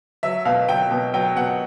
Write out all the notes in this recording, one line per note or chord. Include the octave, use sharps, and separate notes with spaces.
F#3 E5
B2 F5
F#3 G5
B2
F#3 G5
B2 F#5